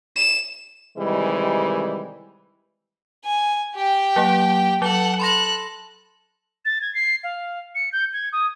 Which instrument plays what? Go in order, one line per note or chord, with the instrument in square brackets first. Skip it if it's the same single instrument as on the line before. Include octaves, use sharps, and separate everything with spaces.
[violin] E7
[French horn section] C3 D#3 E3 G3 G#3
[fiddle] G#5
G4 G5
[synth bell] F#3 A#3 F#5
[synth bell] F#3 G7 [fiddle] A4 F#5
[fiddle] A4 F#6 [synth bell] B5 C6 A#6
[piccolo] A6
G#6
C7
F5
C#7
G6
G#6
D#6